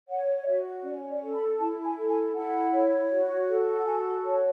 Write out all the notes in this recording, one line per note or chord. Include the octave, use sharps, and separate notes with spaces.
C#5 F#5
D5
F#4 E5
C#4 D5
D5
A4
B5
E4 A5
G#5
A4
G#5
E4 F#5
C#5
F#4
A4
F#5
F#4 G#5
C#5 A5